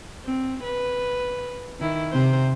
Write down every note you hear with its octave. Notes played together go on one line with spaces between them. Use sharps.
C4
B4
D#3 E4
C3 C5